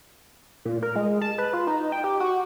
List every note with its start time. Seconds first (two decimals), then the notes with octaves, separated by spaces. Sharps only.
0.65 A#2
0.83 A#4
0.96 G#3
1.22 A5
1.38 B4
1.53 F4
1.67 D#4
1.92 G5
2.04 G4
2.20 F#4